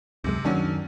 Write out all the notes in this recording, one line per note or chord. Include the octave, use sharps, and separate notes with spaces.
C#2 F#2 C3 G#3
F#2 D#3 F#3 C#4 D4